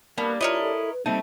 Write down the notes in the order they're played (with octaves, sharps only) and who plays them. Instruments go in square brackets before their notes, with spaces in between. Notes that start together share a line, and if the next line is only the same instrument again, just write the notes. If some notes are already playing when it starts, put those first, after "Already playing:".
[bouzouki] G3 D4 [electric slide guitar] A#3 [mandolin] B3 [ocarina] A#4
[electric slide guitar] E4 [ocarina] F4 [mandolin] A#4 C#5 D#5
[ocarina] A4
B4
[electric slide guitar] G3 C4 D#4 [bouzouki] A3 [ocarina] A#3